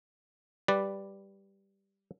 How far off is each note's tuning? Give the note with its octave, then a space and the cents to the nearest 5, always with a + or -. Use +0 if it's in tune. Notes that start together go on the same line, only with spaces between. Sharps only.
G3 +0 B4 +0 D5 +0